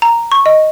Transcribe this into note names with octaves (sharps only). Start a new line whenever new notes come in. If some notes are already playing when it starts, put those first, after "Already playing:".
A#5
C#6
D#5